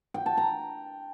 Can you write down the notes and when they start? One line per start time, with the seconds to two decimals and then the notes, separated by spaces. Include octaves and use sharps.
0.14 G5
0.26 A5
0.37 A#5